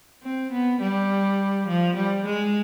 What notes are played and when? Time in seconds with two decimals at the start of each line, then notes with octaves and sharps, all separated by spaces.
0.24 C4
0.52 B3
0.81 G3
1.68 F3
1.96 G3
2.26 G#3